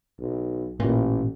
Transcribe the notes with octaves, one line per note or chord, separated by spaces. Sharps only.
B1
A1 A#2